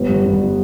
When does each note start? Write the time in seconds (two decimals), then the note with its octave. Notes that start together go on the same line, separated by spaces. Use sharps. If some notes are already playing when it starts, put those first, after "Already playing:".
Already playing: G1 B3
0.09 G2
0.25 G1
0.42 G3